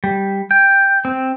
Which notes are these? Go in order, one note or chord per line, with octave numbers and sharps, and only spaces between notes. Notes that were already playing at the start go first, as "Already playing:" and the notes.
G3
G5
C4